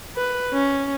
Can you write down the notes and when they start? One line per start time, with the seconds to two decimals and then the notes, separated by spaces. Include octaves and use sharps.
0.17 B4
0.53 C#4